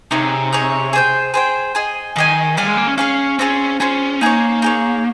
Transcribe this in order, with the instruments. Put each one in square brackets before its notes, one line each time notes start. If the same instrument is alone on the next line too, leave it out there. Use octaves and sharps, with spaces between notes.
[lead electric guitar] C3 [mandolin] D#4 G#4 C#5
[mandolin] D#4 G#4 C#5
G#4 C5 G5
G#4 C5 G5
G#4 D#5 G#5
[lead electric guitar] D#3 [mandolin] G#4 D#5 G#5
[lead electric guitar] G3 [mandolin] G#4 C#5 F5 G#5
[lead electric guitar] G#3
A#3
C#4
[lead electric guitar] C#4 [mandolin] G#4 C#5 F5 G#5
[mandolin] C4 F4 G#4 [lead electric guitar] C#4
[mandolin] C4 F4 G#4 [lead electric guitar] C#4
[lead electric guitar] A#3 [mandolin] D#4 G#4 C#5
[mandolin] D#4 G#4 C#5